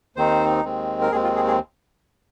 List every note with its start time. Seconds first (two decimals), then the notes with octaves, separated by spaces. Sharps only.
0.16 D#2 D#3 C4 D#4 C5
0.64 D#2 D#3 G#3 C4
1.02 A#4
1.12 D#2 D#3 G#3 C4 G#4
1.23 F4
1.36 G#4
1.47 G#4